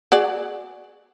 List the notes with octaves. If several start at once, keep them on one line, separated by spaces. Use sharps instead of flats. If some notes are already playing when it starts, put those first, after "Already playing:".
F#4 G#4 D5